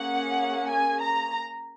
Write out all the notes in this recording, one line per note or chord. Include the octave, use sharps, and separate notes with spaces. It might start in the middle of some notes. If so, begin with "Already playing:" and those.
Already playing: A#3 C#4 G#4 F#5
G#5
A#5